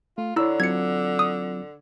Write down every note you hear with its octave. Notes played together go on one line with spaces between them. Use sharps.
A3 F4
D3 E4 C#5 D5 A#5 E6
F#3 C4 F4 G#6 C#7
D#6